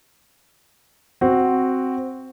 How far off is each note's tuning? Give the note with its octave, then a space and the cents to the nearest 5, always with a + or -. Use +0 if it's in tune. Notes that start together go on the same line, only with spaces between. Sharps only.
C4 +0 F#4 +0